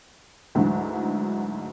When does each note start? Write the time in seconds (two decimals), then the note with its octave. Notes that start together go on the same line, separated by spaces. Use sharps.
0.55 D2 G#2 D3 E3 F#3